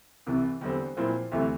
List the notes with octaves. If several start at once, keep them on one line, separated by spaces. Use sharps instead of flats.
C2 C3 E3
E2 D3 G3 C4
A#2 F3 C4 E4
D2 C3 E3 A3